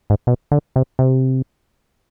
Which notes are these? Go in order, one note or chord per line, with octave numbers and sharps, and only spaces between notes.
G#2
B2
D3
C3
C3